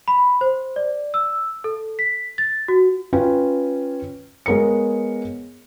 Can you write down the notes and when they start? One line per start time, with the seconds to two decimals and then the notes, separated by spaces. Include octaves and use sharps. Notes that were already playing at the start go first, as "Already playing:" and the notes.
0.08 B5
0.41 C5
0.76 D5
1.14 E6
1.64 A4
1.99 B6
2.38 A6
2.68 F#4
3.13 C#4 F4 B4 G5
4.46 G#3 B3 A#4 C#5 C#7